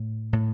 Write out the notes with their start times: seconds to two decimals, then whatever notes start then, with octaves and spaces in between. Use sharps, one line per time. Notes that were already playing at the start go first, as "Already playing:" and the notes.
Already playing: A2
0.33 A2